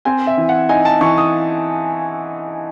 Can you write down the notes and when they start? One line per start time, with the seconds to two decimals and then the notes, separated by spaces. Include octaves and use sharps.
0.05 C4 G#5
0.27 E5
0.37 E3
0.49 F#5
0.69 D#4 G#5
0.85 A5
1.01 E3 C#6
1.17 D#6